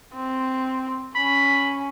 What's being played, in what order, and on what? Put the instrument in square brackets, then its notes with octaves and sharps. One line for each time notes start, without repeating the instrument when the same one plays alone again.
[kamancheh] C4
[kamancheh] C#4 [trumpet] B5